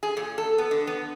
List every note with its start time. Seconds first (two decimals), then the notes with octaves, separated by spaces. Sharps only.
0.03 G#4
0.17 A#2
0.38 A4
0.58 B3
0.71 D3
0.87 B3